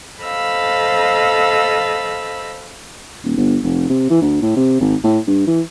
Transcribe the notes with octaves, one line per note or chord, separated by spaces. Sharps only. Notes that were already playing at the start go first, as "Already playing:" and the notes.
A4 C5 D#5 F5 B5 E6
D#1
G1
F1
C3
E3
D2
A2
C3
G#1
A2
G2
E3